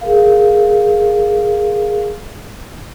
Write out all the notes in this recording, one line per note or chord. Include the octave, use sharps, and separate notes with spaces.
G#4 A#4 F5